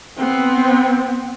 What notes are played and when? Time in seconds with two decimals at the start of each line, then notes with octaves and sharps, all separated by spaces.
0.17 B3 C4